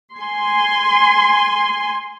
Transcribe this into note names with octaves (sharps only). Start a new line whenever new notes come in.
G#5 C6